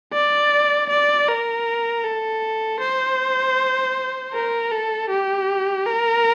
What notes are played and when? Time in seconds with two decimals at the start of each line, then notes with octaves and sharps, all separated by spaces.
0.13 D5
0.90 D5
1.28 A#4
2.04 A4
2.80 C5
4.34 A#4
4.71 A4
5.10 G4
5.86 A#4